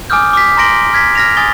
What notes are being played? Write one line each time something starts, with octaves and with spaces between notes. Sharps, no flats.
G#5 D6 D#6 F6 G6
D6 B6
A#5 C6 A#6 D7 F#7 G7
F6 G#6 B6
F6 A#6 F7
G#5 D#6 A6 G7